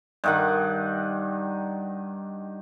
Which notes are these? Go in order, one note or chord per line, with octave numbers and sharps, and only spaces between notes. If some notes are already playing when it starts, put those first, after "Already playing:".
G2 D#3 F#5